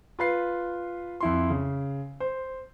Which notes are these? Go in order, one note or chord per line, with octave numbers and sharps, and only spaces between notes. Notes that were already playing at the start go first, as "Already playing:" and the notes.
F4 B4 C7
F2 E4 C6
C#3
C5